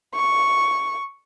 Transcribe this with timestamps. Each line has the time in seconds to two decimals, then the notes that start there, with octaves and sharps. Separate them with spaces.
0.15 C#6